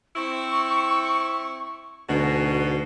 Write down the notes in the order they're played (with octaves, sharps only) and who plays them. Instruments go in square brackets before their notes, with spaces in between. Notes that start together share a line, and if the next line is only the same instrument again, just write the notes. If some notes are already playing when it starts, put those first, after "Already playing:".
[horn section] C4 E4 [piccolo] C#6
[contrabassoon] D2 [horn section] G#2 B2 [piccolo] C7